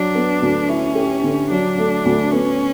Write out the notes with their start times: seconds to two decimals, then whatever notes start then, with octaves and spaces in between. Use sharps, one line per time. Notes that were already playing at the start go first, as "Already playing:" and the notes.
Already playing: F#3 D4
0.15 B3
0.42 D2
0.69 C#4 E4
0.95 G4
1.23 D3
1.50 F#3 D4
1.78 A3
2.05 D2
2.32 B3 C#4